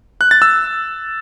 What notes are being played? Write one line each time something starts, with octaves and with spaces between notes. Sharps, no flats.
F#6
A6
E6